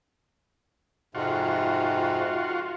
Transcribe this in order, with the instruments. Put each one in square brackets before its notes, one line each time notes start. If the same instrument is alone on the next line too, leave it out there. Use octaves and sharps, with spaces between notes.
[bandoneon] F2 G#2 C3 [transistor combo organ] F4 F#4